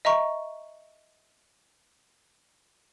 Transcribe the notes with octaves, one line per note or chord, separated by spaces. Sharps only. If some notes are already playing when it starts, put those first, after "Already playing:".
D#5 E5 A#5 C#6